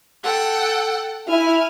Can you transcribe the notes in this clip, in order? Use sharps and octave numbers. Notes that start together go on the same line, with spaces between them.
A4 F#5 G5
E4 G#5 F6